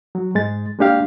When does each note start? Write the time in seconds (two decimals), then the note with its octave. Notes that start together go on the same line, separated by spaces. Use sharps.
0.15 F#3
0.35 G#2 G#3 A6
0.79 G#3 A#3 D4 G4 F5